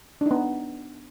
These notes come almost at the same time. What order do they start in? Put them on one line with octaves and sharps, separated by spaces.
D4 D#4 B3